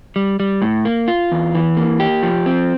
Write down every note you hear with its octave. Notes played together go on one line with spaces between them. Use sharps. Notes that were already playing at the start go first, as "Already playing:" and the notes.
G3
G3
A2
A#3
F4
E2
E3
A#3
G4
F3
C4